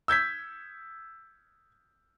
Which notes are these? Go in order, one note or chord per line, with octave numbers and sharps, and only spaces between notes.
E6 G6 G#6 B6